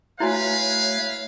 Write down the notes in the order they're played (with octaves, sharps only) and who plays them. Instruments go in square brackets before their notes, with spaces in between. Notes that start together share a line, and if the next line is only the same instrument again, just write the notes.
[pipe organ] A3 C#5 [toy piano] E4 F#4 G#5 [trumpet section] B4 F5